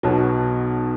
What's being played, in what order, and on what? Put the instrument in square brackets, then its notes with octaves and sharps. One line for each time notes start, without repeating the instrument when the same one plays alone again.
[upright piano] B1 B2 F#3